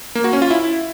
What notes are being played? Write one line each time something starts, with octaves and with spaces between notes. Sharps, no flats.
A#3
F#4
C#4
F4
E4